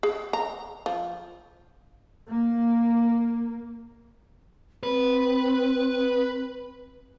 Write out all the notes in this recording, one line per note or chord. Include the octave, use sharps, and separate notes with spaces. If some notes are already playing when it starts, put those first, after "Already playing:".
G#4
A#5
F3
A#3
C4 B4